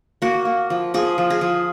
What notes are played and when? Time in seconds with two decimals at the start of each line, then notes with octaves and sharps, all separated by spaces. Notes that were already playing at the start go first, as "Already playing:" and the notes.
0.22 A#3 F#4
0.45 A#3
0.70 F3
0.94 F3 G#4
1.18 F3
1.30 G#4
1.41 F3